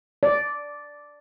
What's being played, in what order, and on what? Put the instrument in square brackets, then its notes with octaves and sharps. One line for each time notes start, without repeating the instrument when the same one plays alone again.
[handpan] D5